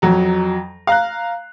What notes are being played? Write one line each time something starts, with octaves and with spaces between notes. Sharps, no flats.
F2 F#3 A#5
F5 A#5 F#6